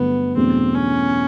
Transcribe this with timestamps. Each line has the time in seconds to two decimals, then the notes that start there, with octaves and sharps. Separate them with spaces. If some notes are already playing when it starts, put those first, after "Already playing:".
Already playing: G2 D3 F#3 A3 B3
0.36 E2 B2 F#3 A3 C4 D4
0.75 C#4